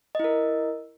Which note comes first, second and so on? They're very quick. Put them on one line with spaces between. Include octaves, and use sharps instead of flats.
D#5 E4 A#4